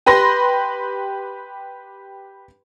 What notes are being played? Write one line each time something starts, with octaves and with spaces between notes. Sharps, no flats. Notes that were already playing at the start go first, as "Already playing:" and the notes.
G4 B4 B5 C6 A#6